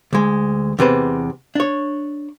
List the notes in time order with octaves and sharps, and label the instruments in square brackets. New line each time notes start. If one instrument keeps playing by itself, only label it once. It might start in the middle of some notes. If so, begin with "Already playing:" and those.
[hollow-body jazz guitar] D2 G#3
E2 C3 B4 C5
D4 C#5